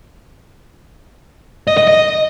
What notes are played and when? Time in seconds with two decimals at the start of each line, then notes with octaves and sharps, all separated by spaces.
1.67 D#5
1.77 D#5
1.88 D#5